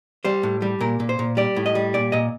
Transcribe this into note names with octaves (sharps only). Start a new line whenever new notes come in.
G3 C5
A2
G3
A#2 A#4
A#2
C5
A#2
G3 D5
A2
D#5
G3
A#2 D5
A#2 D#5